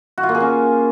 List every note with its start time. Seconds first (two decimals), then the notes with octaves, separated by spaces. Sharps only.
0.18 F#4
0.23 F4
0.29 A#3
0.35 G#4
0.40 C#4